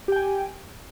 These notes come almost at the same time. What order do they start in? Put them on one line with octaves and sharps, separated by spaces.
G4 G5 G#5